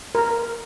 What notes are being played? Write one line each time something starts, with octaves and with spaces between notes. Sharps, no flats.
A#4